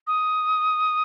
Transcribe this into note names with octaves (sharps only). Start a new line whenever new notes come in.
D#6